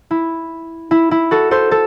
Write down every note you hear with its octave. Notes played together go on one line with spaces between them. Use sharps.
E4
E4
E4
F#4 A4
A4 C5
A4